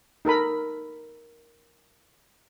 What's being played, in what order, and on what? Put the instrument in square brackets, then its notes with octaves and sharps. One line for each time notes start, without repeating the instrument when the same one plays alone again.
[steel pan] D#4 A4 A#4 B5